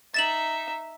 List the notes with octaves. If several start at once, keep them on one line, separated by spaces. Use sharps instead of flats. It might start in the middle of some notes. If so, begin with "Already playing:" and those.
D#4 E5 A6 E7 F#7